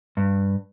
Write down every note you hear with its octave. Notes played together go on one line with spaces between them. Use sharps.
G2